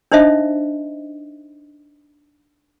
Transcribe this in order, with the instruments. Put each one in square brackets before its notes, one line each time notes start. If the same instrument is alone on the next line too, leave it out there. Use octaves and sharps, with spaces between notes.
[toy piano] D4 D#4 C5 D#5 E5